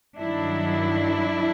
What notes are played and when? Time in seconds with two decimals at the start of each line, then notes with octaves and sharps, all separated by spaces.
0.18 G2 D#3 F#3 D4 E4